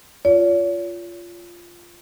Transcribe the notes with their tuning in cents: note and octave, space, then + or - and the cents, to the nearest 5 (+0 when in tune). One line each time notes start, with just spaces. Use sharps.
F4 -10 C#5 +45